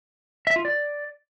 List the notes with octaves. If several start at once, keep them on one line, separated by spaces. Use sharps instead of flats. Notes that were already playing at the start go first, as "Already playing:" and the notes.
E5
F4
D5